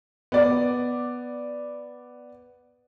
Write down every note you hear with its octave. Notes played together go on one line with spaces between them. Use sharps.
B3 D5